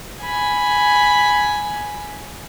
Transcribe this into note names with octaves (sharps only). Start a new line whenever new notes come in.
G#5 B5